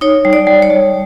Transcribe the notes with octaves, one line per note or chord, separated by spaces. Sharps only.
D#4 C#5
G3
D5
G3
C#5
G3